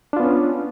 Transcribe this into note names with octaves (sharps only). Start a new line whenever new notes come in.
B3 C#4 D4 F4